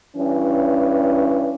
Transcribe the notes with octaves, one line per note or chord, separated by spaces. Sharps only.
G2 E3 C#4